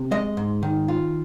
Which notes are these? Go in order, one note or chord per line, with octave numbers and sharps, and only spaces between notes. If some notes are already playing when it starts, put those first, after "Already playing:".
Already playing: C3
G#3 D#5
G#2
D#3
F4